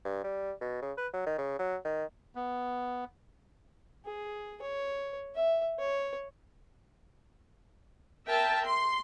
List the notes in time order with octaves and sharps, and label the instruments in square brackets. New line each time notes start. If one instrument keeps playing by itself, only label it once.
[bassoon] G2
G3
B2
C#3
B4
F#3
D#3
C#3
F#3
D#3
[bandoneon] B3
[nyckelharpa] G#4
C#5
E5
C#5
[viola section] A#4 E5 G5 A5
C6